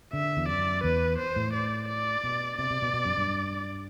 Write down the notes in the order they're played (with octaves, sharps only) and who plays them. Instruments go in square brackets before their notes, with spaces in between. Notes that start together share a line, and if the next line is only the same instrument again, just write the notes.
[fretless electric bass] D3 [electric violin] E5
[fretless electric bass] E2
[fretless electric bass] F#2 [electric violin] D5
[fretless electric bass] E2 [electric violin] B4
[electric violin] C5
[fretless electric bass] A2
[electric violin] D5
D5
[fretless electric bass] B2
[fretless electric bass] C3 [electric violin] D5
[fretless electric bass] C3
B2
B2
F#2
G2